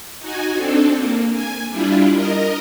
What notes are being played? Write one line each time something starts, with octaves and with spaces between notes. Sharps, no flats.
D#4 F#4 G#5
C4 D4 A4
A#3
G#5
G3 D4 E4 F4
A#4 D#5